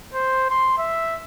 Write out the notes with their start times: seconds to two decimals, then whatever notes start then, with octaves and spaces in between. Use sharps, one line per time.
0.14 C5
0.50 C6
0.78 E5